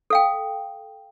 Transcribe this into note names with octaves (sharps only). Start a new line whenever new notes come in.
A4 F5 G5